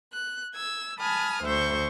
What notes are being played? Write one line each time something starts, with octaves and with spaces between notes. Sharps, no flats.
F#6
E6 G#6
G#5 A5 B5 D#6 F6
D2 C5 E5 C#6 G6